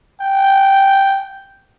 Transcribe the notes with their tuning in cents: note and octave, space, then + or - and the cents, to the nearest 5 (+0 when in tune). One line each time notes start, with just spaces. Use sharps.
G5 -5